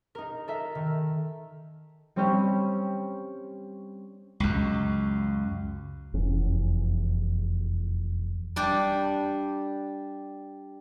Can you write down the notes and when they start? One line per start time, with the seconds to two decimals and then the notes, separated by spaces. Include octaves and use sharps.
0.15 D#4 A#4
0.48 A4 A#4 E5
0.75 D#3
2.16 G3 C4 C#4 G4
4.40 C#2 F#2
6.14 F1 E2 E3 C#4
8.56 G3 D4 G4